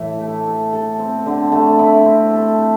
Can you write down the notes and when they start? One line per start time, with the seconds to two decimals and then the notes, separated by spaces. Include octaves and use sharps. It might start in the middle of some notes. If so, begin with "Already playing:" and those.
Already playing: A2 E3 E4
0.20 A3
0.47 A4
0.73 A4
0.99 C4
1.26 D3
1.52 A3
1.79 E4
2.05 C4
2.32 A4
2.59 A3